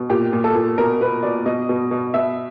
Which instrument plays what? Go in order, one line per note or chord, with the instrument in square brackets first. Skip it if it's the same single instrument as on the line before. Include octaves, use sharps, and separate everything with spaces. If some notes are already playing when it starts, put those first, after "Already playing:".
Already playing: [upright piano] B2
A#2 G4
A#2
A4
A#2
B2 A#4
B2 B4
B2 D5
B2 D#5
B2
B2
B2 E5